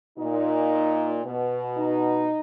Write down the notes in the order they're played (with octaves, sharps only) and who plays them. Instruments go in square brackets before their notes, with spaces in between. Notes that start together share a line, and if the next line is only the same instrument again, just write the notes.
[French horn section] A#2 D#4
B2
D#4